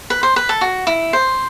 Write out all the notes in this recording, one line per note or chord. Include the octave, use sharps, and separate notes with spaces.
B4
C5
B4
A4
F#4
E4
C5